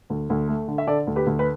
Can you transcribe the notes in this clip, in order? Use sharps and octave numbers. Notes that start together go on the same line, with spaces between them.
D2
D2
A3
D3
E5
D3 A4 D5
D2
G4 B4
D2
B4